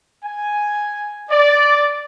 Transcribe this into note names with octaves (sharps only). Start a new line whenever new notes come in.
G#5
D5